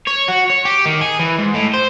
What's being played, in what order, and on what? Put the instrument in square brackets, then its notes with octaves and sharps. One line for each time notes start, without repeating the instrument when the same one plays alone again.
[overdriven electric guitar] C#5
F#4
C#5
G4
D#3
G#4
E3
G#2
A2
C5